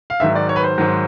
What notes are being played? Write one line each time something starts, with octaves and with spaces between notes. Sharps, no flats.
F5
G#2 D#3 F#3 E5
D5
C#5
B4
C5
G#2 D#3 F#3